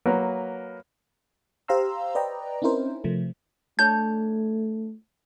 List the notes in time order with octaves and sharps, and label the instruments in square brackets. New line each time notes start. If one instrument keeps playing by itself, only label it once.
[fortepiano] F#3 A#3 A#4 B4
[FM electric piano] G4 C5 F5 A#5 C6 E6
B4 D5 D#5 G5 A#5
C4 C#4 D#4 E4 A#4 C5
C3 F3 A3
[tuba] A3 [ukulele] D4 C#5 A5 [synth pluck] G6